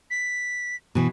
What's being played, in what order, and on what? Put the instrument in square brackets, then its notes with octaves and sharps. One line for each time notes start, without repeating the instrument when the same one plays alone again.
[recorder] B6
[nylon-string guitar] B2 E3